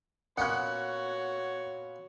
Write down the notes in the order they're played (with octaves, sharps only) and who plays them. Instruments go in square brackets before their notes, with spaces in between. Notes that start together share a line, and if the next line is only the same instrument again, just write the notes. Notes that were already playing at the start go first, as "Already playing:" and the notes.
[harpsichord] A#2 B3 C#4 [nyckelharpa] F#4 C#5 [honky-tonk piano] F#5 F#6